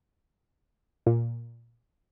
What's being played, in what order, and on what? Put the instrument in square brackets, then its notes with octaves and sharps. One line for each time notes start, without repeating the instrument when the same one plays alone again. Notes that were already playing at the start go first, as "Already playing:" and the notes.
[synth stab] A#2